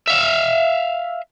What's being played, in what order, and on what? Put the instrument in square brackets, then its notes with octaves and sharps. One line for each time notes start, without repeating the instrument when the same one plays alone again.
[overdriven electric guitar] E5 F5